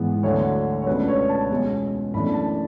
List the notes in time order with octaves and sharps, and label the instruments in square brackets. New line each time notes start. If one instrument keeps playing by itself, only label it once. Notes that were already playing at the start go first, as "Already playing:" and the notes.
Already playing: [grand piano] G#2 E3 G#3 B3
D2 D3 F#3 C#5
C#5
C#2 B2 A3 D4 B4
C#5
A5
E2 B2 G#3 C#4
F#2 E3 A3 D4 B5
A5